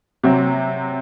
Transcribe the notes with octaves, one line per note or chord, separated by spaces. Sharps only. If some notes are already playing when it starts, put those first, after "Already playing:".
C3 F#3 C4